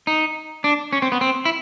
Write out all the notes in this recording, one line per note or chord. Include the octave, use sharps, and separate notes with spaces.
D#4
D4
C#4
C4
B3
C4
E4